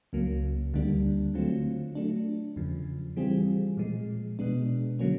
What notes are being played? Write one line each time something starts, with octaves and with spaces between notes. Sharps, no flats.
C#2 C#3 F#3 A#3
D2 D3 G3 A#3 D4
D3 F#3 A3 C4 F4
F#3 A3 D4
E2 C#3 F3
E3 G3 C4 F4 G#4
A#2 F3 G#3
B2 G#3 B3 D4
D3 F#3 A#3 C#4